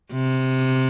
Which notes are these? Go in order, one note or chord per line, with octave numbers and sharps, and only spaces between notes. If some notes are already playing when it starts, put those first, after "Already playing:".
C3